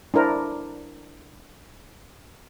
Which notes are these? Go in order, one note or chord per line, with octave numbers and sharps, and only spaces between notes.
D4 E4 A#4 C5